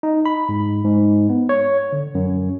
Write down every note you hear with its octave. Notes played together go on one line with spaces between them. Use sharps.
D#4
B5
G#2
G#2
B3
C#5
D3
F#2